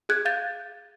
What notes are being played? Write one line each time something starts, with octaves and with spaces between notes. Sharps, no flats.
G#4 F#6 G#6
F5 G6 A6